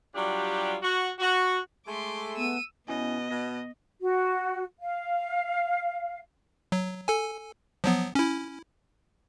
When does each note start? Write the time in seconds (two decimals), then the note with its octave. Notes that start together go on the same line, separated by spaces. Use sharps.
0.15 F#3 G3 D4 F4 G4
0.82 F#4
1.19 F#4
1.87 G#3 A3 C6 D6
2.36 B3 E6 D#7
2.88 B2 B3 C#4 E4 D#5 G#5
3.31 B2 A#6
4.01 F#4
4.80 F5
6.72 F#3
7.08 A4 G#5
7.84 F3 F#3 B3
8.15 C#4 E4